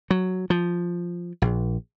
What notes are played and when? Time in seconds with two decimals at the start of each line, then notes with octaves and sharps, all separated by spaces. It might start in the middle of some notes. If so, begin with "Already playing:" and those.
0.10 F#3
0.50 F3
1.42 A#1